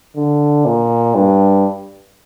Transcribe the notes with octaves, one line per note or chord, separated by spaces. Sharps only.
D3
A#2
G2